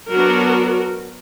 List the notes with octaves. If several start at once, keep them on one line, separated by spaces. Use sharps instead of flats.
F#3 B3 D4 F#4 A#4